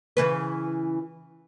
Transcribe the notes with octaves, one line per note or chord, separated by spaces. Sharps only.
C#3 E3 B4